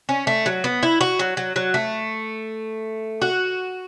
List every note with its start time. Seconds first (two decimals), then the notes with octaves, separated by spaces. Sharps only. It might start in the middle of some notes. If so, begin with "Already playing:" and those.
0.09 C#4
0.27 A3
0.46 F#3
0.64 B3
0.83 E4
1.01 F#4
1.19 F#3
1.37 F#3
1.56 F#3
1.74 A3
3.22 F#4